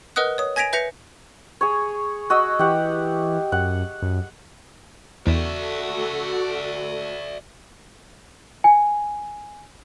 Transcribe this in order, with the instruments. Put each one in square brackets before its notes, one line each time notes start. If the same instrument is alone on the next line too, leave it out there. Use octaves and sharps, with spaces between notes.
[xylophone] A#4 B4 D#5 F#5 D#6 F#6
C#5 D#6
G#5 G#6 A#6 B6 D7 F7
B4 E5 G6 A#6 C#7 F7
[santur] G#4 C#5
F#4 D#5 E6
[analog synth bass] E3 [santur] G4 F#5
[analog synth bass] F#2 [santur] F#5
[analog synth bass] F#2
[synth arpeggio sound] E2 [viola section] F#4 A4 [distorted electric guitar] D5 E5
[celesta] G#5